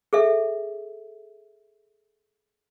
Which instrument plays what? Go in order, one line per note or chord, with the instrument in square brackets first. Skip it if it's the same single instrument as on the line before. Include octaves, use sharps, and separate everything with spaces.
[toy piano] G#4 A4 E5